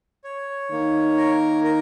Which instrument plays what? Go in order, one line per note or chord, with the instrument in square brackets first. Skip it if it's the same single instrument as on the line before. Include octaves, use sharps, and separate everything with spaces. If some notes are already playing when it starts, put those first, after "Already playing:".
[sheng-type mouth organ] C#5
[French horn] D#3 [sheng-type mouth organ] A#3
[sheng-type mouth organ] A#4
A#4